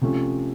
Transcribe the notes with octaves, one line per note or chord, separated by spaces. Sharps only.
C3 F3 A3 C#4